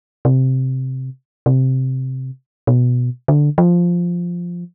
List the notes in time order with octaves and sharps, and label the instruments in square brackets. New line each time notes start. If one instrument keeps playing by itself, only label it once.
[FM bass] C3
C3
B2
D3
F3